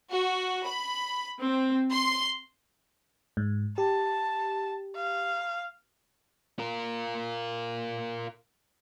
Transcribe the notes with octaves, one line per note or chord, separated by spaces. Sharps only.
F#4
B5
C4
C6
G#2
G4 A5
F5
F4 A#4